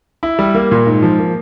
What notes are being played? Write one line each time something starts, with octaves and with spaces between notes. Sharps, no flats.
E4
G3
A#3
A#2
G#2
F3
A#3